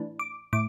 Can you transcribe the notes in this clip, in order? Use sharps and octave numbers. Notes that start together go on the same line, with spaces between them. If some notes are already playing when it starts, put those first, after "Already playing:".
Already playing: A2 E3 D4
D6
A2 D6